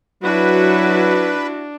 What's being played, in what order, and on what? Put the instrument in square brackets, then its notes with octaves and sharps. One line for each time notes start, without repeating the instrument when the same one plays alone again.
[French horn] F#3 [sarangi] D4 [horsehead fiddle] E4 F#4 [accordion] B4